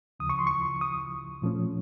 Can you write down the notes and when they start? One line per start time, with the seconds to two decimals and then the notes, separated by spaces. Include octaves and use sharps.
0.20 D#2 C#3 F3 D#6
0.30 C#6
0.39 C6
0.47 C#6
0.81 D#6
1.42 A#2 F3 A3 C#4